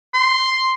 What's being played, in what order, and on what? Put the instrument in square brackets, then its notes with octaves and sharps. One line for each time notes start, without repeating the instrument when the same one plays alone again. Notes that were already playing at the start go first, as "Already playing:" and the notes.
[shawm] C6